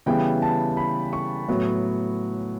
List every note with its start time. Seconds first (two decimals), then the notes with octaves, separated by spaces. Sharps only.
0.06 C#3 E3 G3 B3 G5
0.42 A5
0.77 B5
1.13 C#6
1.48 A2 F#3 B3